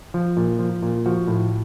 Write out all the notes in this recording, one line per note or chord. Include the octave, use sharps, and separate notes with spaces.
F3
A#2
F3
A#2
F3 F#4
A2